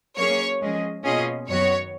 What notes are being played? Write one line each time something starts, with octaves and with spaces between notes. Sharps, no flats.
F#3 A#3 C#4 G#4 C#5
F3 G#3 C#4 G#4 D#5
B2 A#3 C#4 F4 G#4 D#5
F#2 D#3 F#3 B3 F#4 C#5